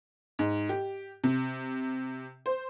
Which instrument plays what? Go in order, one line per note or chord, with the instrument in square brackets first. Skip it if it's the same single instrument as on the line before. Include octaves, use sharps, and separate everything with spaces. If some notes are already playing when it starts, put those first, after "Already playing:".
[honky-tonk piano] G#2
G4
C3
C5